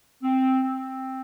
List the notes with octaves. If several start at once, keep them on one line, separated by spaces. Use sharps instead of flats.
C4
C4